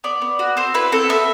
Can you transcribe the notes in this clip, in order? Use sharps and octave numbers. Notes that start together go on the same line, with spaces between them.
B3 D5
B3
F#4
C4 C5
E4 B4
C4 A4
B3 E5